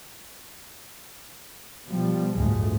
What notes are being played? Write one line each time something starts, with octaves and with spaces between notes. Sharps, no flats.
B2 F3 G3
G1 D2 A2 F3 G#3 A3